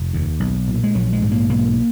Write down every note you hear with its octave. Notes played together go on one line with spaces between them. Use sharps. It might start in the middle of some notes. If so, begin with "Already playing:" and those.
Already playing: F1
D#2
B1
A#2
G#3
A#1 F#3
G#3
G#2
A#3
B1 A#3